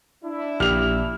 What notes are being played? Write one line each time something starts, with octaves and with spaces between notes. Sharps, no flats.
D4 E4
A#1 G4 F6 F7